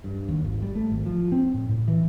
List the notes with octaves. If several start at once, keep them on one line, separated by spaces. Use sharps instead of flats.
G2
D#2
G#1
G3
A3
G#1
F3
C4
A2
A2
E3